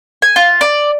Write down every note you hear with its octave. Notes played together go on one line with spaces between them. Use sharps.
G#5
F4
D5